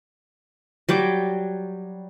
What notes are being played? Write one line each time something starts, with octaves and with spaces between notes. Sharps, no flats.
F#3 G3 G5 D6